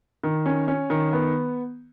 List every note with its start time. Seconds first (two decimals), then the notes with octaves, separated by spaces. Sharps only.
0.24 D#3
0.46 C#4
0.68 C#4
0.90 D#3
1.13 B3